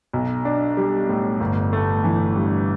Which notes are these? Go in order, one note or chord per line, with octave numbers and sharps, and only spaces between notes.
B1
D4
G3
A2
G1
A3
E3
G2